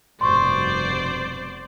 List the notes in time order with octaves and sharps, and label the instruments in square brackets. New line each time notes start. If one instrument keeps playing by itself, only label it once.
[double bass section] F1 G2 B2 [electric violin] C5 D5 [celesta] C6 C#6